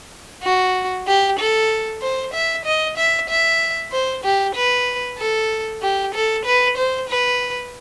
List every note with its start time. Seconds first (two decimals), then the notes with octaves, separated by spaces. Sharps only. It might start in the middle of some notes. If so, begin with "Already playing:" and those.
0.43 F#4
1.07 G4
1.39 A4
2.02 C5
2.33 E5
2.65 D#5
2.97 E5
3.29 E5
3.92 C5
4.24 G4
4.55 B4
5.18 A4
5.82 G4
6.14 A4
6.45 B4
6.77 C5
7.09 B4